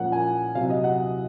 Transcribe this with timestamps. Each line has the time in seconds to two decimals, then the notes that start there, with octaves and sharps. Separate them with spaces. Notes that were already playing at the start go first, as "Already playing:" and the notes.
Already playing: A#2 F3 A#3 C#4 F#5
0.12 G#5
0.55 C3 F#3 C4 F5
0.70 D#5
0.84 F#5